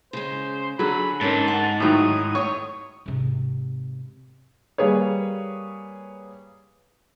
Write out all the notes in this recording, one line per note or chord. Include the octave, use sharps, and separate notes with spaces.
C#3 G#3 C5
D3 F#3 G#4 A4 B5
F2 G#2 C#4 A#4 A5
F#5
A2 D#3 F#3 G#3 A#5 D#6
A3 C#5 C#6
G#1 C3
G3 A#3 G#4 B4 C#5